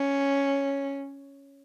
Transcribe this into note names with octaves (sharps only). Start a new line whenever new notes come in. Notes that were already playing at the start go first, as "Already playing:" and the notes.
Already playing: C#4